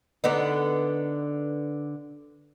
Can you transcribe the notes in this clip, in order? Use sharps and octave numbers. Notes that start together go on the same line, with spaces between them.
D3 B3 D#4